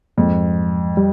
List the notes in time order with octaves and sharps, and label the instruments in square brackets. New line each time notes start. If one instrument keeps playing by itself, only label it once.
[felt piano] F2 [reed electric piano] G#2 F3 G#3
[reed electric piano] G3